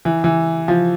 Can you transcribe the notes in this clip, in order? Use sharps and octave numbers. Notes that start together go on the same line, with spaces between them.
E3
E3
F3